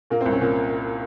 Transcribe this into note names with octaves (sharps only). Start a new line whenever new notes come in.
A#2 A#3
C4
C2
C#4
A#2